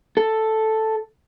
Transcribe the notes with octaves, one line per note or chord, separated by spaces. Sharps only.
A4